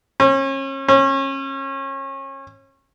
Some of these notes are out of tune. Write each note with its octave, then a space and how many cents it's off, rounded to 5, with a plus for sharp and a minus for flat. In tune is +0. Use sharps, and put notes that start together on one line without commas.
C#4 -35
C#4 -30